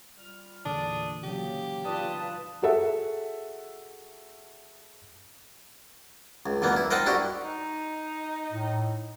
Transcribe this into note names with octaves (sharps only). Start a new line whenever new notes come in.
G3 F4 F6
E2 A#2 D3 E3 D4 G#4 D#6
C#3 F#3 A#3 G4
F4 B4 D5 A5 D#6
F#4 G#4 A4 E5 F#5
C#2
D2 E3 A#3 B3
E4
A#4 C5 D#5 F#5 G5 A5
D4 E4 F#4 G4
D#4
A2